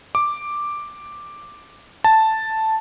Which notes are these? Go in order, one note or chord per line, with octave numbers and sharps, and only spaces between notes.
D6
A5